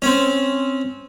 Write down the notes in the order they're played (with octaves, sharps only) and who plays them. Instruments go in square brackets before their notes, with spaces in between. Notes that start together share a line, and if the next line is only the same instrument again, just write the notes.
[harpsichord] C4 C#4